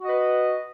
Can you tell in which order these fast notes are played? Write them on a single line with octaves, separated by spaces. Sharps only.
F#4 D#5 B4